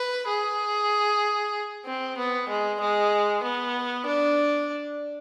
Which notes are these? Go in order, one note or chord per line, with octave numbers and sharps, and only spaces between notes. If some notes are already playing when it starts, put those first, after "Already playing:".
Already playing: B4
G#4
C4
B3
G#3
G#3
B3
D4